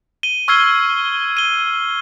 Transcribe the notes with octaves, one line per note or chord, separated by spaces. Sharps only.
D#7 G7
C#6 E6 F6 G#6 C7 G7
D#7 G7